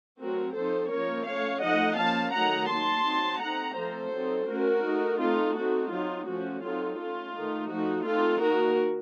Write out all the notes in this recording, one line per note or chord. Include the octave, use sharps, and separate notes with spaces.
F#3 A3 C4 F#4 A#4
F3 C4 D#4 A4 C5
F3 A#3 C#4 A#4 C#5
A3 C#4 C#5 F5
F3 A3 D#4 D#5 F#5
F3 A#3 C#4 F5 A5
D#3 F#3 A3 D#4 F#5 A#5
F#3 A#3 D#4 A5 C6
F#3 C4 D#4
A3 C4 D#4 F#5 A#5
F3 A3 C4 A4 C5
F#3 C4 D#4
A3 C#4 F#4 A#4
A3 D#4
A3 C4 D#4 F4 A4
A3 C4 D#4 F#4
F#3 C4 D#4 F4
F3 A3 C#4 F#4
F#3 C4 D#4 F4 A4
A3 C#4 F4
D#3 A3 D#4
F3 A3 D#4 F#4
A3 C4 D#4 F4 A4
D#3 A#3 D#4 F#4 A#4